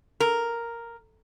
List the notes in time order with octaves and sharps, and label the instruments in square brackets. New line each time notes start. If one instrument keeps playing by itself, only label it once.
[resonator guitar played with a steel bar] A#4